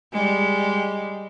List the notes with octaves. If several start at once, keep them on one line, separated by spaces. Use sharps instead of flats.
G3 G#3